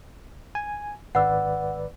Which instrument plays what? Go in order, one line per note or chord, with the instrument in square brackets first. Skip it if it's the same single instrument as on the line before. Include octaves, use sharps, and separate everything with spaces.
[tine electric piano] G#5
[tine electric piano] G#1 B4 D5 [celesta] F#5 E6